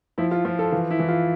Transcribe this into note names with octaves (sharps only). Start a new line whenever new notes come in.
F3 E4
F4
F3 F4
A4
E3 F4
E4
E3
F4